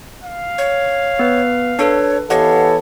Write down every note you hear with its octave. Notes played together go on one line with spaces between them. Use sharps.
F5
C#5
B3 B4
D4 A4 B4 C#5
E3 B3 G4 A4 C#5 D#5 F5 F#5